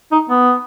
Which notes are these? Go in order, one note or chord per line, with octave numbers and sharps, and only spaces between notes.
D#4
B3